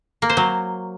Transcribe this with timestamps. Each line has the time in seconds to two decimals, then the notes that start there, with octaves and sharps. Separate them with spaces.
0.22 A#3
0.29 C5
0.37 F#3